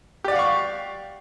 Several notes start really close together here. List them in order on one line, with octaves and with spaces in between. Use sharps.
G4 D5 F#5 F5 C#6